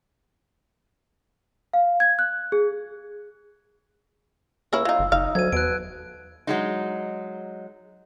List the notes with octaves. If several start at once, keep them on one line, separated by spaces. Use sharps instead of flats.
F5
G#6
F#6
G#4
C#2 A#3 C#4 E4 E6
E3 D#4 F4
G1
F#1 D#4 F5
D2 F#3 G#6 D#7
E2 B2 F#6 D7
F#3 G#3 D#4